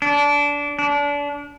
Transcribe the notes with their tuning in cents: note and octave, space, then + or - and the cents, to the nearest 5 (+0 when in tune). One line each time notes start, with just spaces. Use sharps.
D4 -20
D4 -30